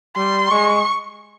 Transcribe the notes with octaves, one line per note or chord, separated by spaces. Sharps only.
G3 C6
G#3 C#6